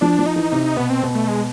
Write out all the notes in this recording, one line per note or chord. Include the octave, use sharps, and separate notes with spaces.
F3 D4
F3
D#4
E3
C3 D#4
D#4
B2 B3
C4
B2
A3
G#3